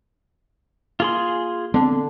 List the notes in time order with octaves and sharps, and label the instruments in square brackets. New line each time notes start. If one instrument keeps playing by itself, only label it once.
[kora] A#3 [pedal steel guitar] F4 G#4 C6
[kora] D3 D4 [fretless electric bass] B3 C4